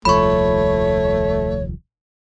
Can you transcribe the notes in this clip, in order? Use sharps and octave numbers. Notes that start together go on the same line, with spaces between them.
D#1 C2 F3 A3 C#5 B5 C#6